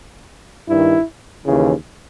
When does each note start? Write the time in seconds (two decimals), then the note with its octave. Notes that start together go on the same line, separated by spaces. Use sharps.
0.67 G2 D#3 E4
1.45 D#2 C#3 E3